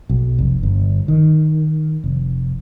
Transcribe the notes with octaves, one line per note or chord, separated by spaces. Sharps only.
B1
F1
G1
D#3
F1